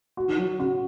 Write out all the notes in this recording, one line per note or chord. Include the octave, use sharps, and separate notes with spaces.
F#4
D#3
F#3
C#3 F#4